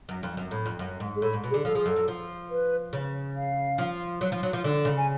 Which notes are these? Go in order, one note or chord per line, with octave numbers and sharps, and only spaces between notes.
F#2
F2
F#2
A2
F2
F#2
G#2
G#4
A2 A4
G#2
B2
G#4
D3
F3 A4
F3 G#4
F#2 A4
F#2
F3
B4
C#3
F5
F3
F#3
F3
F#3
F3
D3
C#3
G#5